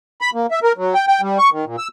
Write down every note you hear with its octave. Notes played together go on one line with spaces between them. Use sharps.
B5
A#3
E5
A#4
F#3
G5
G5
G3
C#6
D#3
A#2
E6